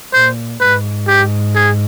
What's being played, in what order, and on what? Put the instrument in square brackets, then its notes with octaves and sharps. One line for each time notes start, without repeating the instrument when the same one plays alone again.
[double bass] A#2 [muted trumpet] C5
[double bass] G#2 [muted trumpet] B4
[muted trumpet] G4
G#4